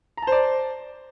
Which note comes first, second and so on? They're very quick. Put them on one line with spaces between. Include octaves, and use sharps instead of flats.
A#5 A5 C5 D5